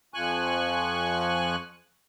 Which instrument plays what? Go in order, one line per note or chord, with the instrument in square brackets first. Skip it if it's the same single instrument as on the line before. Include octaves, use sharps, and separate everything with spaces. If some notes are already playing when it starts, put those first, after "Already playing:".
[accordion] F2 F3 G#5 C#6 F#6